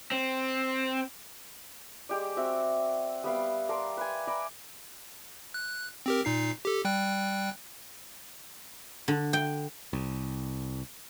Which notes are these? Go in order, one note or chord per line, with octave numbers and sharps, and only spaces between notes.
C4
G#3 G4 D5
C4 F#4 E5
G3 B3 E5 F5
A#4 D5 A5 C6
B4 G#5
D5 A#5 B5
F#6
C4 G4 A#4
A#2 D#4 C7
G4 A4
G3 G5 F#6
D3
G5
C2